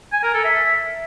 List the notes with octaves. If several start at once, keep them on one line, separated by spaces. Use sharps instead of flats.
G#5
A#4
A4
E5